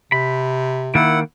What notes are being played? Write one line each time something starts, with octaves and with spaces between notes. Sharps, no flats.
C3 B5
D#3 A#3 E4 F#5